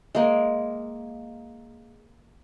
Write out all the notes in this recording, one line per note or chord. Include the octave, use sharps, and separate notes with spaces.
G#3 A#3